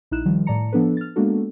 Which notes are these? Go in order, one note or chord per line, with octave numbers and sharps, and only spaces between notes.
A#1 D#4 E4 F#6 E7
D#3 F3 G3
A2 D5 A5 A#5 C#7
F3 B3 D4 A4 B4
F6 A6
G#3 A#3 B3 D4 F#4 A4